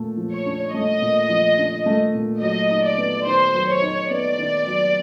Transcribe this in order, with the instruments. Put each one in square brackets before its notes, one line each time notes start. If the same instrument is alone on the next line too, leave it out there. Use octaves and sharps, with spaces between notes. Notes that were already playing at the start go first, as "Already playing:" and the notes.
Already playing: [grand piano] A#2 A3
F3
[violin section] C#5
[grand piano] D4
[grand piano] A3 [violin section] D#5
[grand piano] A#2
F3
D4
A3
A#2
[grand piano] F#3 [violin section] D#5
[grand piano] D#4
[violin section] D5
[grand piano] B3
[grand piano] D#3 [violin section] C5
[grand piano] F#3
[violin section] C#5
[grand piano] D#4
[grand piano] B3 [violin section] D5
[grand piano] D#3
F#3